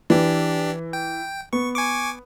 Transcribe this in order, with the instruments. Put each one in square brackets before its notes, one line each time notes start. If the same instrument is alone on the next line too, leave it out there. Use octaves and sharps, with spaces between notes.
[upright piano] E3 [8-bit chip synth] D4 G4
[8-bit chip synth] G5
[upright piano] B3 [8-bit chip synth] C#6
[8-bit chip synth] G#5 C#6 D6